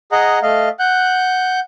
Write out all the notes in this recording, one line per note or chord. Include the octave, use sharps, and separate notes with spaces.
G#4 D#5 F#5 A#5
A3 D#5 F5
F#5 F#6 G6